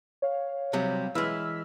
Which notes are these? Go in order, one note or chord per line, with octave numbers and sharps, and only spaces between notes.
C#5 F5
C3 F#3 G3
E3 G#3 E6 F6 B6